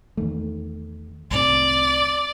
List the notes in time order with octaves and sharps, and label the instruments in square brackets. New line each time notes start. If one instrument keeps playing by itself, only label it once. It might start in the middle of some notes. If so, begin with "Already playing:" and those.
[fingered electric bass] E2 D#3 A3
[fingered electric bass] C2 A2 C3 [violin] D5